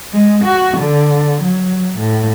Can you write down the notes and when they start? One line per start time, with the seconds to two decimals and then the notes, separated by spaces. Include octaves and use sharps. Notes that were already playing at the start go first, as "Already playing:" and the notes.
0.13 G#3
0.44 F#4
0.77 D3
1.42 F#3
1.99 A2